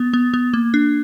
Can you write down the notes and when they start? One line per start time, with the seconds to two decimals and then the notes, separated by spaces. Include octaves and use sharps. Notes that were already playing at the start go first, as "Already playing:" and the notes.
Already playing: B3
0.13 B3
0.34 B3
0.54 A#3
0.74 D4